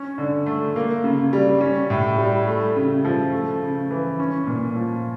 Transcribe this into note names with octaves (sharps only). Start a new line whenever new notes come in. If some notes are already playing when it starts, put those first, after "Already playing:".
Already playing: C#4
D3
A3
A#3
C#3
G3
C#4
A2
G3
A3
C#3
F3
A3
C#3
E3
C#4
A#2
F3